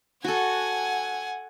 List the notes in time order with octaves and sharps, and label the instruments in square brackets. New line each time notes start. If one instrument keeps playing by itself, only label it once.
[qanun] F#4 A4 [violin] F#5 G#5